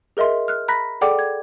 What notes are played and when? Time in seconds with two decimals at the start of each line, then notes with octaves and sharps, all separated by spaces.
0.17 G#4 A#4 D#5 E5 C6
0.48 F6 F#6
0.68 A#5 B5 F#6 A#6 B6
1.01 G#4 A4 D5 F#5 G5 D6
1.19 G#6